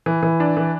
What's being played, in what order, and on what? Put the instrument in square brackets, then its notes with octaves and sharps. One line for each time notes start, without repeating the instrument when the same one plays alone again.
[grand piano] E3
E3
D4
E3